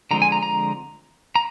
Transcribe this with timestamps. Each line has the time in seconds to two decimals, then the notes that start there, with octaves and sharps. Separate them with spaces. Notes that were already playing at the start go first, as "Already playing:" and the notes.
0.11 D3 F3 G#3 C4 A#5
0.22 G#5
0.32 A#5
0.43 A#5
1.36 A#5